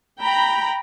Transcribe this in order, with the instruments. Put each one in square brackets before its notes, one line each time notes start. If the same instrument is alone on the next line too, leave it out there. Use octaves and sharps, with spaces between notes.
[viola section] G5 A#5 B5